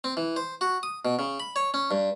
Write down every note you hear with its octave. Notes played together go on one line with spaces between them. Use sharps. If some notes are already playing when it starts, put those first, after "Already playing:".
C4
E3
C5
F#4
D#6
B2
C#3
B5
C#5
C#4
G2